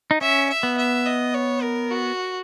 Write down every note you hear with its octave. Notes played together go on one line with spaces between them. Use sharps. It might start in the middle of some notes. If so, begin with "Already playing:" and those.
D#4
C#4 E5
E5
B3
E5
D#5
C#5
A#4
F#4